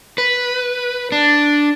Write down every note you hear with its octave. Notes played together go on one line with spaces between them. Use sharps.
B4
D4